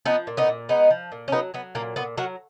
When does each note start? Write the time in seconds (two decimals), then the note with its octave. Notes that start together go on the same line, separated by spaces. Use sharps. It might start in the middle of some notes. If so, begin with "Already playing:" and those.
0.06 F3 B3 D#4
0.27 A#2
0.37 B3 D#4
0.48 A#2
0.69 G#3 B3 D#4
0.90 F3
1.12 A#2
1.28 C#4
1.32 F#3 B3 D#4
1.54 F#3 B3
1.75 A#2 A#3
1.96 A#2 B3
2.17 F#3 F#4 A#4